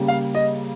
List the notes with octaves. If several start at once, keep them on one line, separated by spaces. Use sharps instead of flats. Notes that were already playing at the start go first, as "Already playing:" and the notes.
Already playing: C#3 G3 A#3
F5
D#5